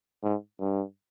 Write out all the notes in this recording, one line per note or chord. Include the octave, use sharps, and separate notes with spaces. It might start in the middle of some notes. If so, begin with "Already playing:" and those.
G#2
G2